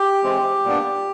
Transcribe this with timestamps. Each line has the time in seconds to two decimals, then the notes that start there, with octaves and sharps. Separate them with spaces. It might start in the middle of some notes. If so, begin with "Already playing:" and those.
Already playing: G4
0.23 E3 G#3 C4
0.65 A#2 G3 B3 D4